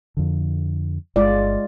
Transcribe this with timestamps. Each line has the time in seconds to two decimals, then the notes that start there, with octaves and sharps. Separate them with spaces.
0.17 F2 D3
1.16 G1 G#3 F4 D5